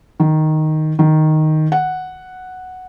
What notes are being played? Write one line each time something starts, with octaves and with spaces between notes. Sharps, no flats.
D#3
D#3
F#5